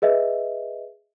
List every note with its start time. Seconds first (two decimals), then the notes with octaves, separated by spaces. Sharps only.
0.02 G#4 B4 D#5 E5